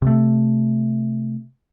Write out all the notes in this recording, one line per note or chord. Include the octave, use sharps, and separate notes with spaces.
C3 A3